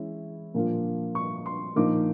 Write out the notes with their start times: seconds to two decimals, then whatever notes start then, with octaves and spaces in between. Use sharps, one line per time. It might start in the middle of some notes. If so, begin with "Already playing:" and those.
Already playing: E3 G#3 C#4 E4
0.54 A#2 F3 A#3 D4 F4
1.15 C#6
1.46 C6
1.76 A#2 F3 A#3 D#4 D6